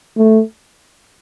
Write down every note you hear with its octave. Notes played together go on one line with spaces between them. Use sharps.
A3